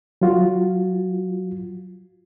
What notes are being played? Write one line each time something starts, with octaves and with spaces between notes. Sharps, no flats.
F#3 F4 F#4